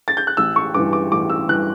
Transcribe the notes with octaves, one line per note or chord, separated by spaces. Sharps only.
A6
G6
F#6
A1 E6
C#6
G2 E3 D6
D6
A1 D6
E6
G2 E3 F#6